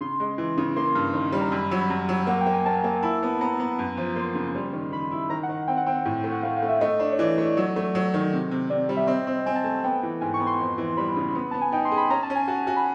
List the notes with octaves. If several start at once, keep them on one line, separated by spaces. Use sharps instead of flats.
C#3 C6
G#3
E3
C#3
A#3 C6
G2
D#3
G3
A#5
F#2 B5
F#3
B5
F#2 A#5
F#3
A#3 F#5
G5
A#3
G#5
A#3 A5
A#3
E4 A5
B3
B3 A#5
B3
F#2
F3
A#3 C6
C#3
G3
D#3
D#3 B5
E4
D#3 A#5
F#5
D#3
C4 G5
F#5
C4 G5
A2
A3
F#5
A3 F5
F5
A3
E5
A3 D#5
D4
C#5
E3 D5
A3
F#3
A3
F#3
D#3
C3
C3
C3 D5
G3
E5
C4 D#5
C4
C4 G#5
A5
A3 G#5
B3 G5
E3
G#2 G#5
C#6
B3
C6
F2
E3
G3 B5
C#3
B3
B3 A5
G#5
D#4 G5
C6
G#4
B5
C#4 A#5
A5
C#4
G#5
F#4 A5
F#4
B5